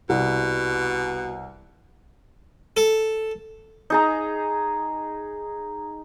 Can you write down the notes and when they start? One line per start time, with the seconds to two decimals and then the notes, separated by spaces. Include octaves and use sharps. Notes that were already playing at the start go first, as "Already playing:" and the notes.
0.09 C2 B2
2.77 A4
3.90 D#4 G#4 A#5